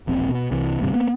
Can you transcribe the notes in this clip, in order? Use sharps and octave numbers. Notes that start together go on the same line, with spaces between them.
E1 A#1 C4
B2
C2 C3 E3
G#1 D2 G2 C3
A#3 B3